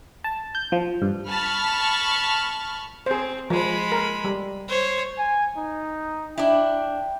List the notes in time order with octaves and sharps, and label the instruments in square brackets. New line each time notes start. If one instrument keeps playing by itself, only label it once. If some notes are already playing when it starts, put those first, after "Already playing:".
[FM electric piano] A5
G6
F3
G2
[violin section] A5 B5 C#6 F6
[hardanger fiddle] C4 [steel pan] G#4 C5
[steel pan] F3 [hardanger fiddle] G#3 B5
[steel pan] A#4
G3
[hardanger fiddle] C5 C#5
[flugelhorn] G#5
D#4
[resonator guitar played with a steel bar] D4 E4 [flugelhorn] G5